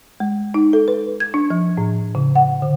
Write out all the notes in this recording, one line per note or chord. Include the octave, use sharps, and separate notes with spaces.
G#3
D#4
A4
B4
G#6
D4
F3
A2
C#3
F#5
D3